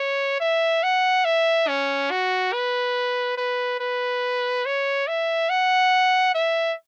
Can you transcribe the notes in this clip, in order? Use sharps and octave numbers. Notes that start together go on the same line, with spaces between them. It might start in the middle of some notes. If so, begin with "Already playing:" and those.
Already playing: C#5
E5
F#5
E5
C#4
F#4
B4
B4
B4
C#5
E5
F#5
E5